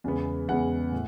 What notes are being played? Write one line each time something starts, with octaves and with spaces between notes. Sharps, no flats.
E2 C#3 G#3 B3
E2 C#3 G#3 B3 F#5
A2